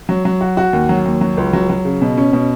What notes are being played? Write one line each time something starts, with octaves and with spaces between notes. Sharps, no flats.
F#3
F#3
F#4
F#4
D#2
F#3
D#2
F#3
C#2
F#3
F#3
C#3
B2
C#4
B2